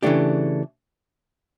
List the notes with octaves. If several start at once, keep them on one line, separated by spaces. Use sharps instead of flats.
C#3 E3 A3 D4 G4